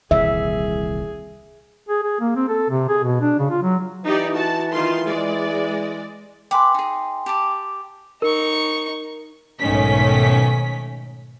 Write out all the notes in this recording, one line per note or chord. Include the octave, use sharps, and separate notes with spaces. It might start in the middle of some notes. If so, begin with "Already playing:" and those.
D#1 C2 E3 G#4 E5
G#4
G#4
A#3
C4
A4
C3
G#4
B2
D4
C#3
F4
F#3
E3 D#4 G4 D5
F#4 A5
D#3 F4 C6
G#3 D5
B4 G5 G#5 C6 D6
D#4 G#4
G4 A5 D6
D#4 A#4 C#6
B1 G#2 D#3 A3 C#4 B6